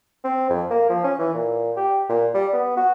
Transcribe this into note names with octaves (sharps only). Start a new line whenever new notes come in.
C4
F2
A#3
F3
C#4
E3
A#2
G4
A#2
G3
B3
F#4